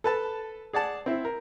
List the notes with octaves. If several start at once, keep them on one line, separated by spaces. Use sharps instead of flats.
A4 B4 A5
G#4 D5 F#5 A5
C4 E4
A#4